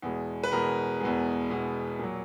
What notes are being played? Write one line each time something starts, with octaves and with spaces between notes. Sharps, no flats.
E2 B2 G#3
B4
E2 B2 G#3 A#4
E2 B2 G#3
E2 B2 G#3
A#2 F#3